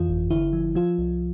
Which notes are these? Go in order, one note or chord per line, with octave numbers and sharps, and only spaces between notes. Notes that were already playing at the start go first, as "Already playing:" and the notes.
Already playing: F2 E3 F4
G1
D3 E4
F3
F3 F4
C2